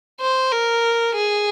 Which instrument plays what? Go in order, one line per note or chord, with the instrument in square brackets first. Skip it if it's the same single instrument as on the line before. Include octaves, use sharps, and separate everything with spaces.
[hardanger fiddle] C5
A#4
G#4